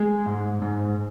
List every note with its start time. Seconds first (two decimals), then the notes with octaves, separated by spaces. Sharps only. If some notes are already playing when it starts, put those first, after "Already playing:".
Already playing: G#3
0.26 G#2
0.62 G#2